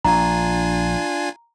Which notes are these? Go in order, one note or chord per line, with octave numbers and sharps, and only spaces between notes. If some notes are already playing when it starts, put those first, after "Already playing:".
A#1 D4 F4 G#5 A#5